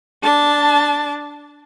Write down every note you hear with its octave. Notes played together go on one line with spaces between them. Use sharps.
D4 A5